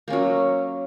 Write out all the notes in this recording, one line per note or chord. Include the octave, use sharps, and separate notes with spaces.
F#3 A#3 C#4